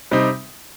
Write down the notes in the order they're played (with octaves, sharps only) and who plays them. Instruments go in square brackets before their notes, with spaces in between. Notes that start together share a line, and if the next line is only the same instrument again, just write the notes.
[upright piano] C3 G3 C4 D#4